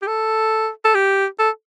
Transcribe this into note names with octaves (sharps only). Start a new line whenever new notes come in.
G4
A4
A4
G4
A4